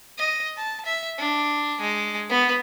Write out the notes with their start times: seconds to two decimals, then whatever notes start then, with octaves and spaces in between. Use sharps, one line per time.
0.18 D#5
0.57 A5
0.86 E5
1.18 D4
1.81 G#3
2.30 B3